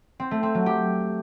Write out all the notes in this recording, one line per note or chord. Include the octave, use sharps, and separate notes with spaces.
C4
A3
C4
F#3
G4